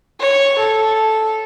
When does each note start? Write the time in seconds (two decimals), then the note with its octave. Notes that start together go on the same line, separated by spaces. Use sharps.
0.20 C#5
0.59 A4